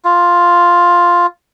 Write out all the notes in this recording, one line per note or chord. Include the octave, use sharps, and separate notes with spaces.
F4